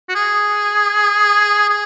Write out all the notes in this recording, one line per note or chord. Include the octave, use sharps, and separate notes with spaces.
F#4
G#4
G#4